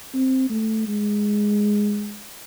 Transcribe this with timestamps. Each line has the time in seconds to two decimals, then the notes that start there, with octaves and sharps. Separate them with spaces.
0.14 C4
0.50 A3
0.88 G#3